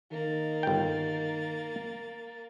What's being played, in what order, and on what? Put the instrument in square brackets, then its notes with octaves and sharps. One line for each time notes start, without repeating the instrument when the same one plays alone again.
[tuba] D#3 [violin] A#3 A6
[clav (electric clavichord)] G1 G5